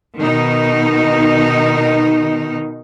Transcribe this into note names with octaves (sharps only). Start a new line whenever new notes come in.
B2 D#3 D#4